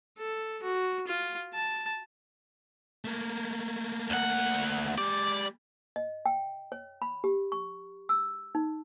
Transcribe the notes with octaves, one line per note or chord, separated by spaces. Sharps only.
A4
F#4
F4
A5
A3 A#3
D2 F#5
G#3 G4 D5
D#5
G5
C#5
B5
G4
C#6
E6
D#4